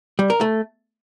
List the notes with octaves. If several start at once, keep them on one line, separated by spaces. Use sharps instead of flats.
G3
A#4
A3